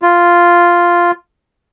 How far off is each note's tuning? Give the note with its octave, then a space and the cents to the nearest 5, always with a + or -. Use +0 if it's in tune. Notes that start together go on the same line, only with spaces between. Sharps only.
F4 -5